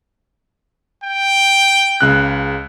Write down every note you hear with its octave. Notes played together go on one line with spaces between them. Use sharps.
G5
C#2 C#3 F#6